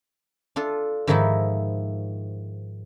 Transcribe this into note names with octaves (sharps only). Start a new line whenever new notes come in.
D4 F4 A4
G#2 D#3 F3 D#4 E4 E5